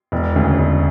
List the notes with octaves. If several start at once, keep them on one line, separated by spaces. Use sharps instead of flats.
E1
D2 C#3
E1